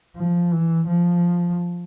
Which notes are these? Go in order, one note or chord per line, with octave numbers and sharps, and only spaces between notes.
F3
E3
F3